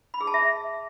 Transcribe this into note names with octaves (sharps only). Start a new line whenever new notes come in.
B5
G#4
A5
E5